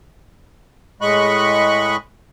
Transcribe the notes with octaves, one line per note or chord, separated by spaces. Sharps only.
A2 G#3 D#5 B5 C#6 F#6